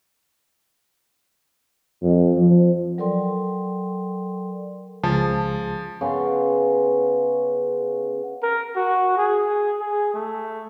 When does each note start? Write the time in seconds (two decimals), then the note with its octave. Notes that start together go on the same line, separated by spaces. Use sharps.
2.03 F2
2.38 F3
2.98 F#3 A4 A#4 D5 G5 C6
5.04 C#2 F3 G#4 A5
6.01 C#3 B3 F5 C6
8.43 A#4
8.76 F#4
9.17 G#4
9.81 G#4
10.14 A3